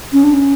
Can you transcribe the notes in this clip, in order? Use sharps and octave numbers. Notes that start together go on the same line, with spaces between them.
C#4
D4
C#4